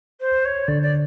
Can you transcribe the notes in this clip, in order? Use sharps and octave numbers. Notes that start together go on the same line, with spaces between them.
C5
C#5
D3 D5
D5